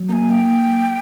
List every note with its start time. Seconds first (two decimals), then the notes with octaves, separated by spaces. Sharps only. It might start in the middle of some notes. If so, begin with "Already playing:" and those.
Already playing: F#3
0.09 A#3 G#5 A#5
0.30 A#3 G5